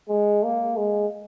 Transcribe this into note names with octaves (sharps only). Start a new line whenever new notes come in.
G#3
A#3
G#3